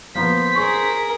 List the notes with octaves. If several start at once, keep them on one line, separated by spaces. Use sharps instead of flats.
F3 A#3 B3 C5 B6
G#4 A#4 C#6